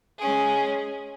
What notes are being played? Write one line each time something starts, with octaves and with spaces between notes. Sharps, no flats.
G#3 C#4 G#4